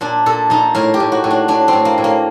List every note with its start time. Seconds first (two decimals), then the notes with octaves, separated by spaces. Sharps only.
0.01 A#2 D4
0.26 A#2 A4
0.50 A#2 D#4
0.75 A2 A#4
0.94 G4
1.00 A2
1.12 F#4
1.24 A2
1.31 D4
1.48 A2 D4
1.68 A2 C4
1.85 A#3
1.98 A2
2.04 A#3